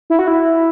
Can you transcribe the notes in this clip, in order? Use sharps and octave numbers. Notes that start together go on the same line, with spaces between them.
E4
F#4
E4